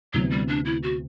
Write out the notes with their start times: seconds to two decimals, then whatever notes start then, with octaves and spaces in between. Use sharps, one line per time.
0.14 D2 C3 E3 F#3 B3
0.31 G3
0.48 D4
0.65 E4
0.83 F#4